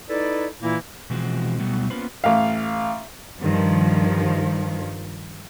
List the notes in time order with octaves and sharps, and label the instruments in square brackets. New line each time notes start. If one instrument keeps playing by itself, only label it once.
[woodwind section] D#4 E4 A4 B4 D5
A#2 E3 A#3 E4
[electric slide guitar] B2 E3 F3 G#3 C4 F#4
B2 F#3 G3 A3 B3
A#3 B3 C#4 F4 B4 C5
[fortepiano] A1 F5
[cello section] G2 D#3 F3